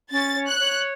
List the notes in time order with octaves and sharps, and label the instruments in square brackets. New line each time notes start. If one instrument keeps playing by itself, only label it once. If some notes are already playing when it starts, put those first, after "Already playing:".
[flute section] C#4 [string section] A6
[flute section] C#5
[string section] F#6
[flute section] C#5